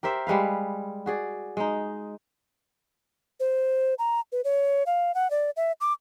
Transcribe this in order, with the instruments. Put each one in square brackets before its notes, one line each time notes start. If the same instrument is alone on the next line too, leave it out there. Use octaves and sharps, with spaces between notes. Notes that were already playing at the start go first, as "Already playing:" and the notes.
[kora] G4 A#4 C5 E5
G3 G#3 B4 F5
F#4 G#4 D5
G#3 D#4
[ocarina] C5
A#5
B4
C#5
F5
F#5
D5
E5
D6